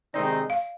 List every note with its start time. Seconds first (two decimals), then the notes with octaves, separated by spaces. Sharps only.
0.14 C3 D#3 G#3 C4 D#4 D5
0.50 F5